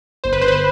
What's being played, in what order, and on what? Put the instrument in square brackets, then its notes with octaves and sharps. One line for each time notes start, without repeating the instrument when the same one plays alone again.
[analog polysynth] G1 C5
B4
G1 C5
B4
C5